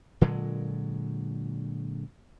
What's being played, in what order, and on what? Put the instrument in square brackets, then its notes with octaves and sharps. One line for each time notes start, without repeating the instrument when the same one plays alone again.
[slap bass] A#2 D3 F#3 G#3